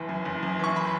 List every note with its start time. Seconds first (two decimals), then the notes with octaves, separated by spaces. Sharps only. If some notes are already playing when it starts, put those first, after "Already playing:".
Already playing: F#1 E3
0.09 F#2
0.25 F#1
0.43 F#2
0.59 E3 C#6
0.76 B5